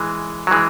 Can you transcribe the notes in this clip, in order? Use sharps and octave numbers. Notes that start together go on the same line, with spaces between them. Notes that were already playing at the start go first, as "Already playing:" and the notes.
Already playing: E3 G#3
F#3
E3 G#3